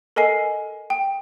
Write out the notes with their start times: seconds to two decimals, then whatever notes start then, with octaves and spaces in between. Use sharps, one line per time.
0.16 A4 A#4 D#5 G#5 C7
0.90 G5